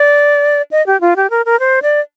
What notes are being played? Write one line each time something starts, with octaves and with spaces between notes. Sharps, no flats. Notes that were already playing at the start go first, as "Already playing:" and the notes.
Already playing: D5
D#5
G4
F4
G4
A#4
A#4
C5
D5